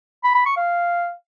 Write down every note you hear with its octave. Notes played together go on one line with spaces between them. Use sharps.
B5
B5
C#6
F5